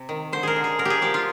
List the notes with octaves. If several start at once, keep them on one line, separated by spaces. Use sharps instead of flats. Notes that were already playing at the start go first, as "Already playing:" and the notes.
Already playing: C3
D#3
D3 C5
G#4 A#4
D3
G#4
D3 A#4
G4 G#4
F3 G4
F4